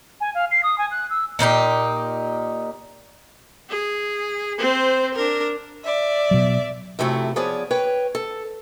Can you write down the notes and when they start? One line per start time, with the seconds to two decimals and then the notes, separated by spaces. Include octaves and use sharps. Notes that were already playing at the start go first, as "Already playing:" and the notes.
0.21 G#5
0.35 F5
0.51 C7
0.63 D#6
0.78 G#5
0.91 F#6
1.10 E6
1.39 A#2 D4 D#4 G4
3.70 G#4
4.58 C4 C5
5.15 D4 A#4
5.83 D5 E5
6.31 B2 F#3
6.99 F#2 C3 F3 A3 E4 A4
7.36 F3 B3 G#4 C#5 D5
7.71 B4 C#5 G5
8.15 A4